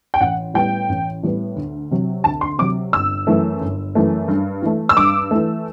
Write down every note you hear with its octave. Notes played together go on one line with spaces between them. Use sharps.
G5
A1 F#5
A2 G3 B3 G5
A1
A2 G3 B3
D2
C3 F#3
D2 A5
C6
C3 F#3 D6
G1 E6
F#2 E3 A3
G1
F#2 E3 A3
G2
E3 A3
E6
G2 D6
E3 A3